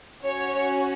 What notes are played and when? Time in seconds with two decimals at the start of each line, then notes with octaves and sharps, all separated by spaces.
0.23 C#4 F#4 C#5